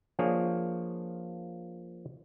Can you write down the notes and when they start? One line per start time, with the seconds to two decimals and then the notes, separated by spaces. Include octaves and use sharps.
0.19 F3 A#3 D4 G#4 C#5